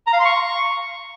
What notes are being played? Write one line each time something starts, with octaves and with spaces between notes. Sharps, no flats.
A#5
F5
C6
C#6